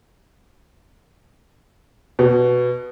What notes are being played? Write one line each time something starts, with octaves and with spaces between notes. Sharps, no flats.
B2